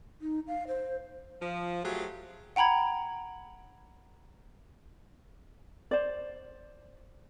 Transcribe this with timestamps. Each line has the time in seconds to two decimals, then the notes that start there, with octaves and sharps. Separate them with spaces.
0.22 D#4
0.48 F5
0.68 C5
1.41 F3
1.84 F#3 A3 F4 G4 G#4
2.56 F#5 G5 A#5 B5 G#6
5.91 C5 D5